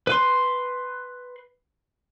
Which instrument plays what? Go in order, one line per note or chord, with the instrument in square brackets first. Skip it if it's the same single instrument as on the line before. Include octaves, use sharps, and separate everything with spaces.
[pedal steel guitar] B4 C6